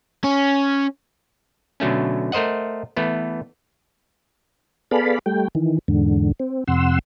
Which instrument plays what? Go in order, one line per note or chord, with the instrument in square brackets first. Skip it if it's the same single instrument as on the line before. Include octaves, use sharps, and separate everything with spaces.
[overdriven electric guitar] C#4
[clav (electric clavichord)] B2 D3 F#3 A3 C#4
A3 A#4 C5 D#5 F#5
E3 A3 B3
[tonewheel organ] B3 G#4 A4 D5 F5 B5
G3 A3 G5
D#3 E3
E2 G#2 D3
C4
F2 C3 F#5 C6 E6